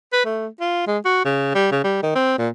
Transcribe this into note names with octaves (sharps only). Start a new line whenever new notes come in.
B4
A3
F4
G#3
F#4
C#3
G3
C#3
G3
D#3
C4
A#2